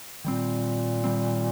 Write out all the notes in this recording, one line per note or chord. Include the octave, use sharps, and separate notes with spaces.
A#2 D#3 G3 C4
D#3 G3 C4